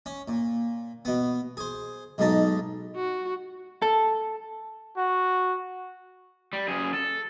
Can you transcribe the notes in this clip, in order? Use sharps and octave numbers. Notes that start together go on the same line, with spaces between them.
C#4
A#2
B2 B3
G#4 C5
B1 G#2 B2 D#4 A5
F#4
A4
F#4
G3
F#2 G#4
A4